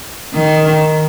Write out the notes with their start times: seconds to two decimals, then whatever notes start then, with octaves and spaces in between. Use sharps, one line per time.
0.33 D#3